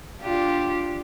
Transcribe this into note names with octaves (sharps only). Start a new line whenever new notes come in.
D4 F4 G4